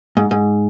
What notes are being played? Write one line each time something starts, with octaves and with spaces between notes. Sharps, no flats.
G#2
G#2